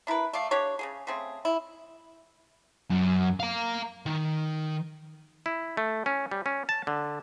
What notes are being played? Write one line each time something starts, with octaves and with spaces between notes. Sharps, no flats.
D4 E4 A#4 B4
A3 D5 F5
D4 G4 C#5
C#3 A#3 G#4
C#3 A3 C4 G#4
E4
F#2
F5 A#5
D#3
E4
A3
C#4
G3
C#4
A5
D3